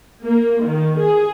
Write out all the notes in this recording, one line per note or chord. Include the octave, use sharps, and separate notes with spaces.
A#3
D#3
G#4